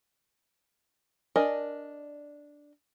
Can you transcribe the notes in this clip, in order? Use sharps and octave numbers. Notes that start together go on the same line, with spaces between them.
D4 A#4 D5 D#5 G#5